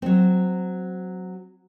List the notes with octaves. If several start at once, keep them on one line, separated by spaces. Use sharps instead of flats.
F#3 C4